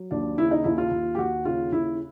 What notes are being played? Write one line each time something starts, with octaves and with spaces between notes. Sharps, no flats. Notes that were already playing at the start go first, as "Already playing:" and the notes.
Already playing: F#3
D#2 D4
C#3 E4
D#4
D#2 E4
F4
D#2
G4
D#2 F#4
C#3 F4
D#2 E4